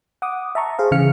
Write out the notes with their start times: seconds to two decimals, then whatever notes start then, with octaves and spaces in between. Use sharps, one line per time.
0.22 F#5 D6 D#6
0.55 E5 A5 A#5 C#6
0.79 G#4 C5 F5
0.91 C#3 E3 F5 F6 C#7